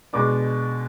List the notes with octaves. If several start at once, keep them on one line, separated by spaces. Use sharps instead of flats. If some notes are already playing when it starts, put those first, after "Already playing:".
B2 G#3 D4 D6